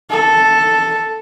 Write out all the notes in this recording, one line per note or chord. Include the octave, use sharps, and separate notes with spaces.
A4